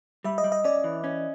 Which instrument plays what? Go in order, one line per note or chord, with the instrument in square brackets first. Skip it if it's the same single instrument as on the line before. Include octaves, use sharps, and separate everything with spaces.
[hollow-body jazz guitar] G3 [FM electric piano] E5
[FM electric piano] D#5
[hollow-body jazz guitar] G3
[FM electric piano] D#5
[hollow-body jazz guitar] C#4 [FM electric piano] D5
[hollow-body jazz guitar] E3
C#4